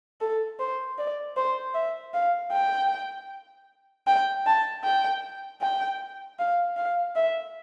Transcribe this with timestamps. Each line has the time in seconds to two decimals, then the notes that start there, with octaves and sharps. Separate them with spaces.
0.21 A4
0.60 C5
0.98 D5
1.36 C5
1.74 E5
2.14 F5
2.52 G5
4.07 G5
4.46 A5
4.84 G5
5.61 G5
6.39 F5
6.77 F5
7.16 E5